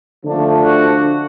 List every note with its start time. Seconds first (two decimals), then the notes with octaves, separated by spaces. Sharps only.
0.24 D3 F3 A3 D4
0.64 F#4